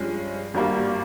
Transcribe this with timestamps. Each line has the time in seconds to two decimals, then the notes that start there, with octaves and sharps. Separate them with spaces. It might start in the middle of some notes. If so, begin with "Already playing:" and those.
Already playing: G2 F3 G#3 C#4
0.54 G#1 G2 G3 A#3